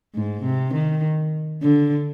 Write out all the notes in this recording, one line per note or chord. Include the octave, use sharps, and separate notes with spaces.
G#2
C3
D#3
D3